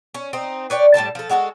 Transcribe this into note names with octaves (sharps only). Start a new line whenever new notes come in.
C#4
C4 D#4
B4 C#5 D5 G5
A2 G3 A4 A5
F3 A4
G#3 F#4 G4 A4